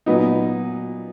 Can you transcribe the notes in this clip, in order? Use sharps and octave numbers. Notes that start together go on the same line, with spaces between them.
A#2 F#3 B3 D#4